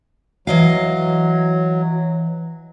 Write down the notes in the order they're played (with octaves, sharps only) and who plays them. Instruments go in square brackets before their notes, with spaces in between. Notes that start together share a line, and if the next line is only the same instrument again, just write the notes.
[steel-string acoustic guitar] E3 D#5 F5 [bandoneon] F#3